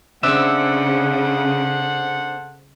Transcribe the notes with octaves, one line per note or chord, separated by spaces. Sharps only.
C#3 C4 D4 A4 C5 E5 F#5